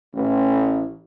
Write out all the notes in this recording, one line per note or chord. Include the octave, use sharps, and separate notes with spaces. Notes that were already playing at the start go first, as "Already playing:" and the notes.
A1